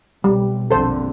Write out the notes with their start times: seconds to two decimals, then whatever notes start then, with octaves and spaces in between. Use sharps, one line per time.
0.24 B1 G3
0.71 A#1 F2 D3 A4 C5